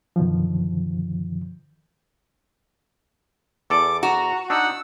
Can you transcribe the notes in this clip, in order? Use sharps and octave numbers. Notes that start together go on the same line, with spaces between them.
F#2 B2 D3 D#3 F3
E2 A4 D5 D6
F#4 A#5
D4 D#4 F#5 E6